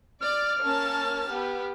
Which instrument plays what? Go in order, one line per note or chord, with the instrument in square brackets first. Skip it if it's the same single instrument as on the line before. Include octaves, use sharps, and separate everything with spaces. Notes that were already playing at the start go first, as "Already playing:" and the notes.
[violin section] D5 [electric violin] F6
[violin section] A#3 C#4 A5
B3 G4